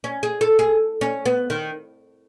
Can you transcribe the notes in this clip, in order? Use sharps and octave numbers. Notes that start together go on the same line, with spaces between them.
C#4
G#4
A4
G#4
C#4
B3
D#3